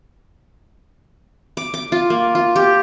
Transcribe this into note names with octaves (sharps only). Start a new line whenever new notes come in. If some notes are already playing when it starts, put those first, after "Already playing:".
D6
D6
F4
A#3
F4
G4